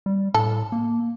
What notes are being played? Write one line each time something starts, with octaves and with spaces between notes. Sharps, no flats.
G3
A2 A4
A#3